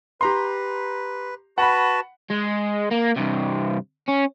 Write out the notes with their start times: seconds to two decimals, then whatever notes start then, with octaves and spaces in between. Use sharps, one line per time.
0.21 G4 B4 A#5 C6
1.58 F#4 B4 F#5 A5 B5
2.30 G#3
2.91 A#3
3.16 G2 C3
4.08 C#4